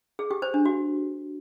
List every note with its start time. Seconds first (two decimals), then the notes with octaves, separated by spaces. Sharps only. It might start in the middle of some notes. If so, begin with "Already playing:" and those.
0.19 G#4
0.31 G4
0.42 C5
0.54 D4
0.65 F#4